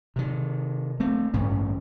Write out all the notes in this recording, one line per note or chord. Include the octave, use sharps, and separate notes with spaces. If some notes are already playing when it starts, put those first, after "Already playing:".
C3 D#3
A3 C4
A1 G2 D3 C#4